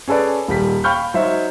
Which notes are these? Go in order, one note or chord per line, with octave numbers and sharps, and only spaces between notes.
C#4 G#4 A4 B4 D5
D#1 G3 B6
F5 G5 B5 C#6 F6 G6
F#3 D#4 C5 C#5 E5